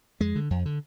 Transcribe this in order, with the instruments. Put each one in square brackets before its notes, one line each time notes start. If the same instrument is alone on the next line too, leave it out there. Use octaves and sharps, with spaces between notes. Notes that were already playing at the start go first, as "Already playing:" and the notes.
[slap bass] F2 G#3
D3
F2
D3